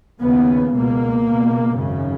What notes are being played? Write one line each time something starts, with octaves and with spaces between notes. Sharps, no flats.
D#2 C#3 B3
C#2 B2 A#3
C#2 B2
G#1 F#2 C#3